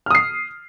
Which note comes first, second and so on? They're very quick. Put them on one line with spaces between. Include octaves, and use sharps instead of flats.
F6 D#6 C7